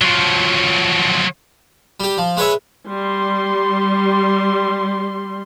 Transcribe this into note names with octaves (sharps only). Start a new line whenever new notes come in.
F3 F#3
G3 G4
F3
G#3 B4 C#5 E5
G3 C6